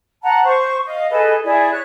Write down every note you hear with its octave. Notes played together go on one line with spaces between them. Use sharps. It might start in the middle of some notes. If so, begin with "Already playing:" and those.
F#5 A5 A#5
C5 C#6
D#5 F5
G#4 A4 B4 D#5
E4 G#4 D5
C#5 F#6